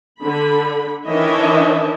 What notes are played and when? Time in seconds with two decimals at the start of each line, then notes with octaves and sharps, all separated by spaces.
0.21 D3 B5
1.06 D#3 E3 D4 C#5 D#5 E5